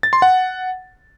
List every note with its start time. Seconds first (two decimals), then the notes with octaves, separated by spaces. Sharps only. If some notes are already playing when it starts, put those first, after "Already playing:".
0.03 A6
0.13 C6
0.22 F#5